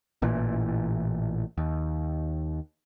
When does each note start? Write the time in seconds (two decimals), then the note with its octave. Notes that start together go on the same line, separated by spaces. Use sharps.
0.22 A1 A#2 E3
1.58 D#2